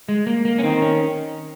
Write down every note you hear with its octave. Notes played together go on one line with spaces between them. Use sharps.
G#3
A#3
A#3
C#4
D#3 C4
C#4